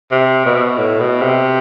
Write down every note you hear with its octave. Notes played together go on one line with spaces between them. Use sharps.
C3
B2
A2
B2
C3